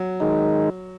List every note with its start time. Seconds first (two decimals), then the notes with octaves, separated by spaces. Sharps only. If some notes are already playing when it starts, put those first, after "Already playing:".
Already playing: F#3
0.20 D#3 G#3 D#4